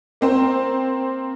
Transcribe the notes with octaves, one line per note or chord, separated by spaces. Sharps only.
A#3 C4 C5